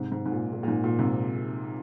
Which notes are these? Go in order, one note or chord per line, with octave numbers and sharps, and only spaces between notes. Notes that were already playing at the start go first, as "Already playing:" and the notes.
Already playing: G#2 C3
G#2
G#2
A#2
A#2
A#2
G#2
A#2
G#2 C3